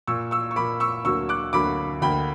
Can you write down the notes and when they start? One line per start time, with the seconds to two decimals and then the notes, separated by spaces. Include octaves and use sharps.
0.07 A#2 A#3 C#6 E6
0.31 C#6 E6
0.51 C#6
0.56 A#2 A#3 B5 D6
0.80 C#6 E6
1.05 D2 D3 F#3 A#3 C#6 E6
1.29 D6 F#6
1.53 D2 D3 F#3 A#3 B5 D6
2.02 D2 D3 A#3 G5 B5